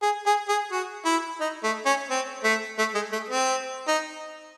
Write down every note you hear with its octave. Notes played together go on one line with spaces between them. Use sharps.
G#4
G#4
G#4
F#4
E4
D#4
A3
C#4
C4
A3
A3
G#3
A3
C4
D#4